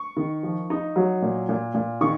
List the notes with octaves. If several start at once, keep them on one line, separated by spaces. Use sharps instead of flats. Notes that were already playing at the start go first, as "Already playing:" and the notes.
Already playing: C#6
D#3
F3
D#4
F#3
A#2
A#2
A#2
D#3 C#6